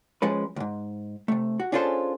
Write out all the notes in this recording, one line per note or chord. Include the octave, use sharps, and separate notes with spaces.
F3 G#3 C#4 B4
C#2 G#2
C3 A3
F#4
C#4 D4 F4 G#4 A4 C5